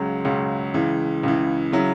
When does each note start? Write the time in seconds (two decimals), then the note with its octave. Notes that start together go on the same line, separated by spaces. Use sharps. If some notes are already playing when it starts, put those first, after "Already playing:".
Already playing: C#2 C#3 F#3
0.25 C#2 C#3 F#3
0.74 C#2 C#3 E3
1.23 C#2 C#3 E3
1.72 C#3 F#3 E4